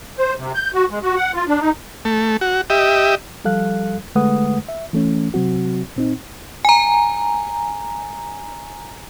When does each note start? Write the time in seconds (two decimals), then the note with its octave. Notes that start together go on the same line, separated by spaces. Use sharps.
0.19 C5
0.37 C3
0.55 G6
0.74 F#4
0.90 G#3
1.03 F#4
1.16 F#5
1.34 F4
1.47 D4
1.60 D#4
2.05 A3
2.41 F#4
2.70 G4 D#5 E5
3.45 F3 G3 A4 F5 F#6
4.15 D3 G#3 A3 B4 F#5 D#6
4.69 E5
4.93 E3 A3 C#4
5.34 C3 F#3 C4 F#4
5.96 A#2 C4 D#4
6.65 G#5 A#5